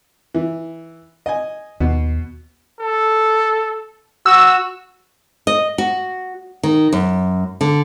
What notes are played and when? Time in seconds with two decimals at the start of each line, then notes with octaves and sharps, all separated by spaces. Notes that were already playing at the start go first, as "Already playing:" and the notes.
0.35 E3
1.26 D#5 G#5
1.81 D#2 B2
2.80 A4
4.26 F#4 E6
5.47 D#5
5.78 F#4
6.63 D#3
6.93 F#2
7.61 D3